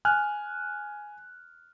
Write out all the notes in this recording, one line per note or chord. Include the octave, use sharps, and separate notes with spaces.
G#5 F6 F#6